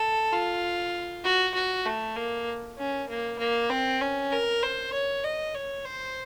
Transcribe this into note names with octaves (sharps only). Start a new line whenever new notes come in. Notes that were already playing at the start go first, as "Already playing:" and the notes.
Already playing: A4
F4
F#4
F#4
A3
A#3
C#4
A#3
A#3
C4
C#4
A#4
C5
C#5
D#5
C#5
C5